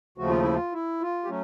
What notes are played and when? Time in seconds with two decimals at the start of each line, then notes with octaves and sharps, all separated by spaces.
0.18 D#2 C#3 F3 A3 F#4
0.29 F4
0.42 E4
0.53 F4
0.73 E4
1.01 F4
1.24 G4
1.28 F#3 A3 C#4